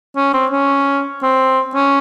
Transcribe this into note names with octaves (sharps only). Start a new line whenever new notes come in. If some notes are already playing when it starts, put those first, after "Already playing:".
C#4
C4
C#4
C4
C#4